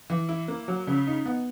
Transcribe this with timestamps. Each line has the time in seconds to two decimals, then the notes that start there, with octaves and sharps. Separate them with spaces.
0.10 E3
0.29 E4
0.48 A#3
0.68 F#3
0.87 C#3
1.07 D#4
1.26 B3